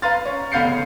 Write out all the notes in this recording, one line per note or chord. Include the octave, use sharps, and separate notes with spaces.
B4 F5 A#5 C6 F6 A6
C#4
F1 B3 F5 G6 C7 C#7
C#3